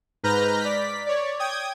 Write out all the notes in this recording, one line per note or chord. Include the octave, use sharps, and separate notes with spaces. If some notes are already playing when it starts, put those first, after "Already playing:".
G#2 B4 A#5 F6 G6 A#6
D5 B6
C#5 D5
G5 D#6 G#6